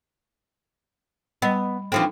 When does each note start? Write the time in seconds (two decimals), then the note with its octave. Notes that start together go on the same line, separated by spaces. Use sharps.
1.42 G3 B3 D#5
1.92 E3 F3 C4 D4 D#4 A4